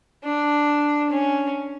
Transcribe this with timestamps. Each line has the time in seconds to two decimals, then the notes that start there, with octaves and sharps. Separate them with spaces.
0.24 D4
1.10 C#4